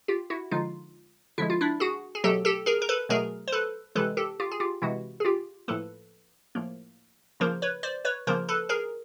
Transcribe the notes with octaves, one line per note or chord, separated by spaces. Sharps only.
F4 G4
E4 F#4
D3 F3 G#3 D#4 F4
D3 F3 G#3 E4
F4
D4 E4
F#4 G#4
G#4
B2 F#3 A3 G4 A4
G4 A4
G#4 A#4
A#4
A4 B4
B2 F#3 A3 G#4 A#4
C5
A4 B4
C3 E3 G#3 A4 B4
G4 A4
F4 G4
G#4
F4 G4
C3 E3 G#3 E4 F#4
G#4
F4 G4
A2 F3 A#3 A4 B4
A2 F3 A#3
C#3 F3 A#3 A#4 C5
B4 C#5
C5 D5
B4 C#5
C#3 F3 A#3 A#4 C5
A4 B4
G#4 A#4